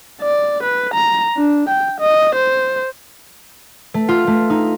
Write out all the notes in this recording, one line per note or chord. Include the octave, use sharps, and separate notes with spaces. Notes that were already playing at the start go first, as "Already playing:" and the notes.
D5
B4
A#5
D4
G5
D#5
C5
A3
F4
A3
D#4